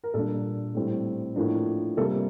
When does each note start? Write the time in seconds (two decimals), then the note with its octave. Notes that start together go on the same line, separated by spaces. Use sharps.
0.04 A#4
0.14 A#2 G3 D4 A4
0.75 A2 G3 C4
1.36 A2 F3 A#3 D4
1.97 C3 G3 A#3 A4